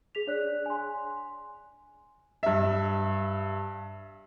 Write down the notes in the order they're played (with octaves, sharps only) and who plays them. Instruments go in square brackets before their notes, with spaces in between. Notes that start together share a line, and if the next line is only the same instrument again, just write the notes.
[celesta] G#4 B6 F7
D4 C#5 D5 F#6
G#5 C6
[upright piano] G2 E5